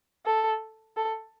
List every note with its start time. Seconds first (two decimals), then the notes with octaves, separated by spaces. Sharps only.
0.26 A4
0.97 A4